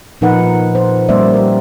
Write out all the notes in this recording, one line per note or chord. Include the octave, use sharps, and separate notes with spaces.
A#2 F3 D#4 A#4 B4 F#5
C5
G3 A#3 C#4 C5 D5 E5
G4 A#4